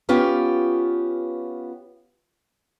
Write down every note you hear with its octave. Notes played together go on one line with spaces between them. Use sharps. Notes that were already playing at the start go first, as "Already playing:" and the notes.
B3 C#4 F4 G4